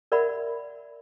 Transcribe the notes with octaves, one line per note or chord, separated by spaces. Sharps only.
A#4 D5 E5 F#5 B5